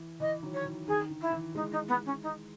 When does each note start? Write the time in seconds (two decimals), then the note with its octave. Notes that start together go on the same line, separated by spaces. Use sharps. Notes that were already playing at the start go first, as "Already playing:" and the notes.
Already playing: E3
0.20 E3 D#5
0.43 D#3 F#3
0.54 C#5
0.65 E3
0.88 D#3 G#4
1.10 D#3
1.21 E4
1.29 D#3
1.32 E3
1.55 E3 G#3 D#4
1.72 D#4
1.88 B3
2.05 C#4
2.22 D#4